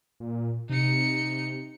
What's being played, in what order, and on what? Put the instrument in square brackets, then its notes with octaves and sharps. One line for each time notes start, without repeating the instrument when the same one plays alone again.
[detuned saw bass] A#2
[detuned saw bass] C3 [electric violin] D#4 C#7